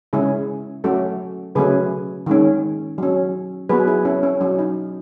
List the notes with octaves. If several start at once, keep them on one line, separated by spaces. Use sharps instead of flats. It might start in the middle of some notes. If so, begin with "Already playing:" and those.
C#3 G#3 C#4 E4 G#4
F#3 A3 C#4 F#4 A4
C#3 F#3 A3 C#4 G#4 B4
D#3 G#3 C#4
F#3 C#4
F#3 B3 G#4 B4
E4 G#4
C#4 E4
C#4
F#3 C#4
D#4